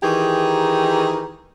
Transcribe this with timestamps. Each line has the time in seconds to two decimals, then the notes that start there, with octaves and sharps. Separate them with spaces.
0.03 D#3 E3 D#4 G4 G#4